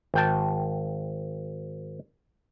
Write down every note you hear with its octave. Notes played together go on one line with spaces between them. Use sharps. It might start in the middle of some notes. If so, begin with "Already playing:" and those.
G#1 G5 A5